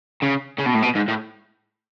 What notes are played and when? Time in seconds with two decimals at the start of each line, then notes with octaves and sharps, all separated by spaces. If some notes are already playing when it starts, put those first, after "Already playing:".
0.23 C#3
0.59 C#3
0.67 B2
0.75 A2
0.83 B2
0.96 G#2
1.08 A2